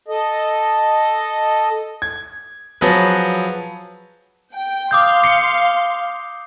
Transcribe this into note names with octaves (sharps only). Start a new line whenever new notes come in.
A4 D#5
G#6
F3 F#3 G#4 B4
G5
F5 C6 D6 D#6 G6
D6 C7 C#7